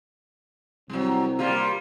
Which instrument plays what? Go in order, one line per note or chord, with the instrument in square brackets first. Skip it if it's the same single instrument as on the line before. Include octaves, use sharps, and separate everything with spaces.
[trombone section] C2 C4 [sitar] F#3 G3
[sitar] G3 A#3 F4